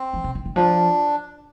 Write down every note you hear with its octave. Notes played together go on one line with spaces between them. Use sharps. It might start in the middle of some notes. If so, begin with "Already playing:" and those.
Already playing: C4
F3
C3
D3
D3
F3 D4